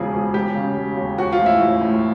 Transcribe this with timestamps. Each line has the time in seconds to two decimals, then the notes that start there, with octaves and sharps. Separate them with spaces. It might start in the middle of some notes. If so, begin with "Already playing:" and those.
Already playing: E1 C#3 F3 G#4
0.13 E1
0.34 E1 G4
0.55 C#3
0.76 E1
0.97 D#2
1.18 F3 F#4
1.32 F4
1.39 A1
1.46 E4
1.61 A1
1.81 A2